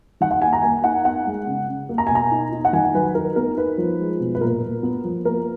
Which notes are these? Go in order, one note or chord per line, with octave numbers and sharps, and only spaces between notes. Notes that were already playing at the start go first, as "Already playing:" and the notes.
D#3 F#5
F#5
A#3 G#5
A#5
A#3 G#5
D#4 F#5
B3 F#5
G#3
C#3
C#3
A#3
A#5
B2 G#5
A#5
D#4
D#4
F#5
D#3 G#5
F#3 B4
D#4 A#4
B3 A#4
D#4 B4
F3
G#3
B2
B4
A#2 A#4
A#2
B3
F3
A#3 A#4